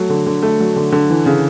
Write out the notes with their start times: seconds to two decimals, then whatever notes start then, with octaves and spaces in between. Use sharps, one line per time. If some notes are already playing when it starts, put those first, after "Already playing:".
Already playing: F#3 A3
0.10 D3
0.26 D3
0.43 A3
0.60 F#3
0.76 D3
0.92 D3
1.10 E3
1.26 C#3